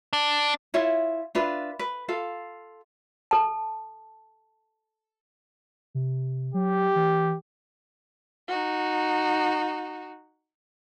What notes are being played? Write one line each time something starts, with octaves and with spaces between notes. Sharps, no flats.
D4
E4 F4 C#5 E5
D4 F4 B4 E5
B4
F4 A4 F5
A4 A5
C3
F#3 G4
E3
D#4 F#4